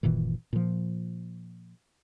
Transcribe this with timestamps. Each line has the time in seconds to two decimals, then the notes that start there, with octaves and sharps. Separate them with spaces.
0.03 F#1 A#2 D#3 E3
0.53 A#2 F3